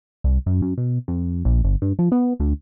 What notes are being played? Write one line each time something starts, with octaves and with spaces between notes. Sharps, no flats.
C2
F#2
F#2
B2
F2
A#1
G1
G2
F3
B3
D2